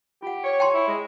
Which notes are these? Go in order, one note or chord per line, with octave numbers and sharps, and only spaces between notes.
F4 G4 F#5
C#5
G5 A5 C6
E4
G#3